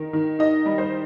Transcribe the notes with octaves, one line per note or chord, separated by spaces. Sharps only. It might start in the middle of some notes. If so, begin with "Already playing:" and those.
Already playing: D#3 A#4
D#3
D#4 D#5
G3
C5